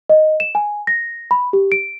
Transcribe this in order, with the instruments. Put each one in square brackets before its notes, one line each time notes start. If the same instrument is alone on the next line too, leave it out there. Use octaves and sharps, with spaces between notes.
[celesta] D#5
E7
G#5
A#6
B5
G4
D7